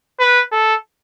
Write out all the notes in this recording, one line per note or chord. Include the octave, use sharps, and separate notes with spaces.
B4
A4